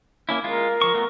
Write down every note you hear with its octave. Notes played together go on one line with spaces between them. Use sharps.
A#3 C#4 E4
G#3 F4 A#4
F3 C#6
A3 B3